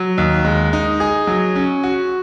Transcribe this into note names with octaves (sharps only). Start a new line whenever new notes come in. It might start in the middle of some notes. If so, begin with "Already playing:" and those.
Already playing: F#3
D#2
G#3
D#4
G#4
F#3
C#4
F#4